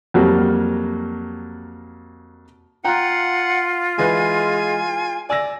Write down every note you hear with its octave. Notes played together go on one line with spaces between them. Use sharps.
F2 F#3 G3 A#3
F4 F#5 G5 A#5 F#6
E3 G#3 B4 G#5
D5 G#5 E6 A#6